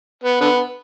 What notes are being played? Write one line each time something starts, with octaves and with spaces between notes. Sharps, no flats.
B3
D3 B3